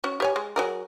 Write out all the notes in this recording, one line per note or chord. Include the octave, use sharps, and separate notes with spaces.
C#4 F#4
G4 C#5 G#5
G#3
F#3 G#4 A#4